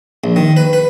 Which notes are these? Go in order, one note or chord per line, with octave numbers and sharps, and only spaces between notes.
A#1
D#3
B4
B4